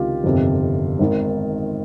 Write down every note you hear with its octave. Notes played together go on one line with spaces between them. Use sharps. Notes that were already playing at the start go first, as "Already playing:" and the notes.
Already playing: C#2 C3 D#3 F4 G4
G1 F2 C3 D#3
G#1 G#2 D#3